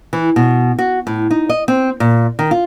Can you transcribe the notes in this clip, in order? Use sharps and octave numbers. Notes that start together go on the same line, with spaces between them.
E3
B2
F#4
A2
D#4
D#5
C4
A#2
D#3
F4